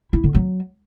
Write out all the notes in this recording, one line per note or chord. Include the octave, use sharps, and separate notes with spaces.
E4
D3
F#3